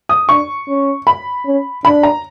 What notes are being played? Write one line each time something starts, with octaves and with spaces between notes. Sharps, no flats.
D#6
D4 C#6
C#4
B5
C#4
D4 B5
A#5